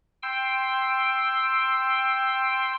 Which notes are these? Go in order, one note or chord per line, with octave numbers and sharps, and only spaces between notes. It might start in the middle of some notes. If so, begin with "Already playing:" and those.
G5 C6 E6